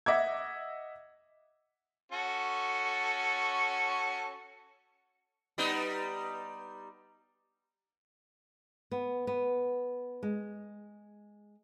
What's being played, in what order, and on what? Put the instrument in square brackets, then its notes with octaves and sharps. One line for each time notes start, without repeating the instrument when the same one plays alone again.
[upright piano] D#5 E5 F#5 D6 E6 G#6
[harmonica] C#4 F#4 A4
[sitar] G3 B3 D#4
[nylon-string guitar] B3
B3
G#3